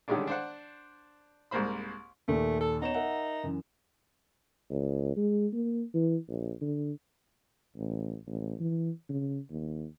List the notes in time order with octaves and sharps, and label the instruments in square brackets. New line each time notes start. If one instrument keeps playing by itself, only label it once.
[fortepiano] D3 D#3 G3 G#3 C#4 D4
D4 C5 F#5
C2 G#2 A#3 C5 B5
[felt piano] D#2 A#2 [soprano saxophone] A3
[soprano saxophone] A4
[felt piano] B3 C#5 E7 [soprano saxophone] D#4
[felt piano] A#4 E5 F#5
F#2 E3
[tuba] C#2
G#3
A#3
E3
A#1
D3
A1
A1
E3
C#3
D#2